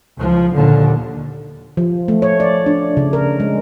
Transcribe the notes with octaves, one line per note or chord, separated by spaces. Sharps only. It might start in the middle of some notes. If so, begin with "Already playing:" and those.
C#2 F3
D#2 A#2 D3
F3
A3
C#5
D5
D4
C#3
A#4
G#3